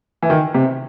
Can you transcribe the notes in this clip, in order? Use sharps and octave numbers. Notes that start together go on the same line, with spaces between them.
E3
D#3
C3